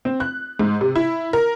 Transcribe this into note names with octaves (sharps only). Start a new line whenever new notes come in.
C4
F#6
G#2
C3
E4
A#4